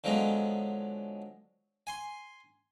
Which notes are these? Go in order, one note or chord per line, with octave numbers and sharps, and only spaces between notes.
D3 F3 F#3 G#3 B3
G#5 C6